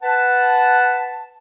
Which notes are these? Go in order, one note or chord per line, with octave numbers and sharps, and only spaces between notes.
B4 F#5 A5